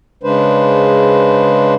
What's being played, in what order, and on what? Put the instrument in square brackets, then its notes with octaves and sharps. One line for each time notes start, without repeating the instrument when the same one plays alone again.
[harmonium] C#3 G#3 D4 B4 C5